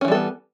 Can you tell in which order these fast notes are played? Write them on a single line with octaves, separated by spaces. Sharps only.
C#4 E3 G3 A4 B3